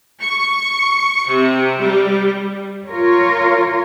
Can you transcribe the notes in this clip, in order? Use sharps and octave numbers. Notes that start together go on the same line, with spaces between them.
C#6
C3
G3
F4 A#4 C#5